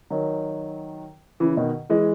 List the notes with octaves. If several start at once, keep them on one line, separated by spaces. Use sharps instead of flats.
D#3 F#3
C#3 E3
B2 D#3
E3 G#3